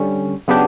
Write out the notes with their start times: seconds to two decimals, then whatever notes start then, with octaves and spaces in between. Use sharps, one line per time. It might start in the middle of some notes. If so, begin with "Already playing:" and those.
Already playing: D3 G3 C#4
0.48 C#3 F#3 B3 D4 G4